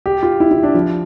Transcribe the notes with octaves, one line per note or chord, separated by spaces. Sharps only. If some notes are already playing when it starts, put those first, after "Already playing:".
G4
F4
E4
E4
D4
F3